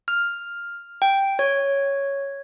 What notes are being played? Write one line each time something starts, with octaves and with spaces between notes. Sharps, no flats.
F6
G5
C#5